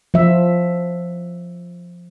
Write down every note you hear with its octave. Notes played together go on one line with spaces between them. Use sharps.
F3 E5